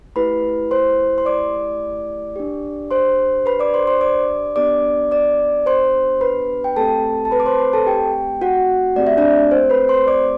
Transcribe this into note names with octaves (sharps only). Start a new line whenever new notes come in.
A3 E4 G4 B4 B5
C5 C6
C6
D5 D6
D4 G4
C5 C6
B4 B5
D5 D6
C5 C6
C5 C6
D5 D6
B3 D4 G4 D5 D6
D5 D6
C5 C6
B4 B5
G5
A3 C4 G4 A4 A5
A5
B4 B5
D6
C5 C6
B4 B5
A4 A5
G4 G5
F#4 F#5
A3 C4 G4 D5
E5
D4 D5
C5
B4 B5
C5 C6
D5 D6